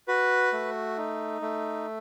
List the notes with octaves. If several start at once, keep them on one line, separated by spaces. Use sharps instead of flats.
F#4 B4
A3
D#4
A3